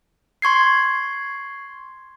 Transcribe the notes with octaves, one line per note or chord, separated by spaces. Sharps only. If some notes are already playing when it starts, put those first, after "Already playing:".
C6 C#6 G#6 C7